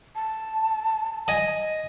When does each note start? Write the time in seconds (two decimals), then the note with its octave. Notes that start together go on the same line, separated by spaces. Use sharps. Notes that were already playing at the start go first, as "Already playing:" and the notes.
0.15 A5
1.28 D#5 G#5